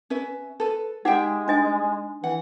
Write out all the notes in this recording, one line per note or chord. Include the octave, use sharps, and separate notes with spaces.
C#4 B4 E5
A4 B4
G#3 D#4 G4 E5 F#5 G5
D4 D#5 G#5
E3 F#5